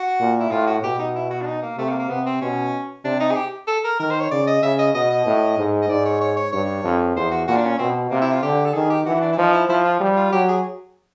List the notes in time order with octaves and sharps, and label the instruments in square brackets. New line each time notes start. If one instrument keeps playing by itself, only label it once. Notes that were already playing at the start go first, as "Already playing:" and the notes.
Already playing: [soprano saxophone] F#4
[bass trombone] A#2
[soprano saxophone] E4
[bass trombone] A2 [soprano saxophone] F4
[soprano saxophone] F#4
[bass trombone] B2 [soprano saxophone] G4
[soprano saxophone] D#4
E4
F#4
D4
D#4
A#3
[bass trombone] C3 [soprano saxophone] A3
[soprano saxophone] A#3
A#3
[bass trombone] C3 [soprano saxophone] B3
[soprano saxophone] C4
[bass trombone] B2 [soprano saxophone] C#4
[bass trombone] C3 [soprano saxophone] D4
[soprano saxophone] D#4
G#4
G4
A4
A#4
[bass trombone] D#3 [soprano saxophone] A#4
[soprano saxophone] C5
C#5
[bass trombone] C#3 [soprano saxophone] D5
[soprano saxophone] D#5
[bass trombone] C#3 [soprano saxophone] E5
[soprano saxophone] D#5
[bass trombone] B2 [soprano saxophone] D#5
[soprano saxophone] D#5
[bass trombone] A2
G#2
[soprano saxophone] D#5
[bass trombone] G#2 [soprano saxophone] D5
[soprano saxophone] C#5
C#5
C#5
[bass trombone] G2 [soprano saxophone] C#5
[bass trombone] F2
[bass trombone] E2 [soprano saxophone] C5
[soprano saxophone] F#4
[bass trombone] A#2 [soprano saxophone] F#4
[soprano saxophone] D4
C#4
[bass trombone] B2 [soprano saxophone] C4
[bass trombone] C3 [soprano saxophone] A#3
[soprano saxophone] E4
F4
[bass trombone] D3 [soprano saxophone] G4
[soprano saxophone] A4
[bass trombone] D#3 [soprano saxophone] G#4
[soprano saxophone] G4
[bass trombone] E3 [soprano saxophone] F#4
[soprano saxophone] D4
E4
[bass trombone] F3 [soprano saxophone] D#4
[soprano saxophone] E4
[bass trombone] F3 [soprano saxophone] E4
[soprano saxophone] F4
[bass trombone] G3
[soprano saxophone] F4
[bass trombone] F#3 [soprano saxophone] G4
[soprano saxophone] G#4